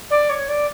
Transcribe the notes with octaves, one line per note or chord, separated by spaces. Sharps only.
D5
C#5
D5